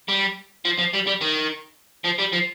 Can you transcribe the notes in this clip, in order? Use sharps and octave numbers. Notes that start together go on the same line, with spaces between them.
G3
F3
F3
G3
G3
D#3
F3
G3
F3